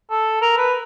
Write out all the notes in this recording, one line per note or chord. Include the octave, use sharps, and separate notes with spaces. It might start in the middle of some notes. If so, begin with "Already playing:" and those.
A4
A#4
B4